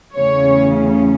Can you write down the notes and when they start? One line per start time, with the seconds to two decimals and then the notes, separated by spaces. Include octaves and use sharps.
0.15 E2 C#3 A3 C#4 C#5